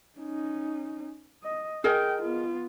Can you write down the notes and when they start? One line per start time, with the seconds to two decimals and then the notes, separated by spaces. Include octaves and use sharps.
0.19 C#4 D#4
1.44 D#5
1.84 G#4 A#4 D#5 G5
2.22 B3 F4